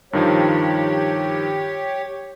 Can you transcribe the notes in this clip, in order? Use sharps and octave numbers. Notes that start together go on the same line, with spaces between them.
G2 D#3 F3 G4 C#5